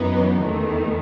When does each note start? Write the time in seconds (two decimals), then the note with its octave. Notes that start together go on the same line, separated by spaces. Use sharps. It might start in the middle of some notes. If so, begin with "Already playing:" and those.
Already playing: F#2 E3 B3 D#4
0.44 E2 D#3 A3